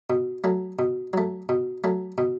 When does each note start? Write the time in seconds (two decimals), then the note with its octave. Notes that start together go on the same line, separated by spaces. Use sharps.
0.10 B2
0.44 F#3 A3
0.79 B2
1.13 F#3 A3
1.49 B2
1.84 F#3 A3
2.18 B2